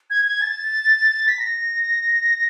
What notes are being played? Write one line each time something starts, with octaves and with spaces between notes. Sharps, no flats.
G#6
G#6
A6
B6
A#6